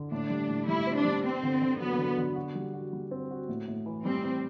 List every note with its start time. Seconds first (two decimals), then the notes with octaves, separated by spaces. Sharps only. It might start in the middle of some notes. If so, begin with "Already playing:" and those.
Already playing: D3
0.12 A2 D4
0.30 G3
0.49 A2
0.68 G3 E4
0.87 C4
0.96 D4
1.05 G3
1.24 B3 C4
1.43 D3
1.62 D3
1.80 F#3 B3
1.98 D3
2.18 D3
2.36 F#4
2.55 G3
2.74 F#4
2.93 G3
3.11 C4
3.31 F#4
3.49 A2
3.68 A2
3.86 E3
4.04 G3 C4
4.23 E3